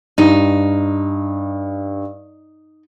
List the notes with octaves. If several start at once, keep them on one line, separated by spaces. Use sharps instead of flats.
G2 D#4